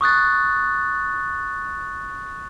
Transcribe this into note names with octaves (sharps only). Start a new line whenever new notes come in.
C#6 D#6 F#6 A6